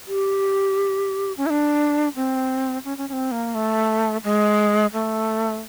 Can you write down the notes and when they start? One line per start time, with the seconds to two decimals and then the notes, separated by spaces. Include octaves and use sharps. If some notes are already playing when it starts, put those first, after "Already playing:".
0.07 G4
1.37 C#4
1.46 E4
1.50 D4
2.16 C4
2.85 C#4
2.98 C#4
3.09 C#4
3.13 C4
3.32 A#3
3.55 A3
4.24 G#3
4.93 A3